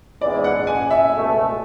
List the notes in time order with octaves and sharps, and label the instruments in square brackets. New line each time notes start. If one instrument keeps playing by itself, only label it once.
[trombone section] G#2 E3 G#3 B3 [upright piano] D5
[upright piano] F#5
G#5
E5
[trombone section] C#2 B2 A3